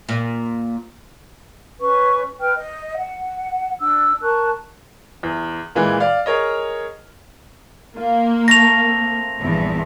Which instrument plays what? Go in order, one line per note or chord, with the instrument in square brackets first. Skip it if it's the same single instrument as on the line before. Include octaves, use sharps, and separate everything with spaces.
[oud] A#2
[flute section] C#4 B4 C#6
B4 G5 F6
D#5
F#5
D4 E6
A#4 A5 C#6 F#6
[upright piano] E2
A#2 E3 G#3 G#5
D5 F5
G#4 A#4 C#5 D#5
[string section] A#3 [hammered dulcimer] F4
[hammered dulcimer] A3 [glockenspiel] A#6 F7
[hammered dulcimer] C4
[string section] A#1 E2 G2